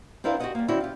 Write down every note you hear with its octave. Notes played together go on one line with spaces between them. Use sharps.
C4 D4 E4 A#4 B4 F5
F#4 G4 A4 C#5 D#5 F#5
G3 A#3
D3 C4 C#4 E4 F#4
F4 G4